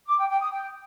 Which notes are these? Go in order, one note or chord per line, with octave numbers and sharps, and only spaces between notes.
D6
G5
G5
D#6
G5